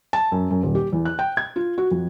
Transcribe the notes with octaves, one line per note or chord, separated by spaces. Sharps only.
A5
F#2
F#2
D#1
G4
E2
F#6
G5
G#6
F4
F#4
F2